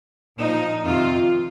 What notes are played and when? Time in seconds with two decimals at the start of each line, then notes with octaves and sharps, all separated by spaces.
0.37 A#2 F3 D#4
0.84 F2 C3 D#3 F4